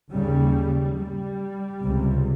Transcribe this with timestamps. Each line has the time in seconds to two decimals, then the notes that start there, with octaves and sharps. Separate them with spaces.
0.11 D#2 C#3 G3
0.96 G3
1.80 C#2 C3